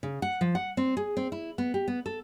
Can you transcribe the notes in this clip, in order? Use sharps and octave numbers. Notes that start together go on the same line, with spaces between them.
C#3
F#5
F3
F#5
C4
G#4
C4
E4
B3
G4
B3
A4